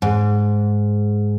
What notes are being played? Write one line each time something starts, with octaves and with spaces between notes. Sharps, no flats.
G#2